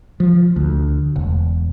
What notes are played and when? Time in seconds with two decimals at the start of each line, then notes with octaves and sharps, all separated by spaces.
0.20 F3
0.56 D2
1.16 E1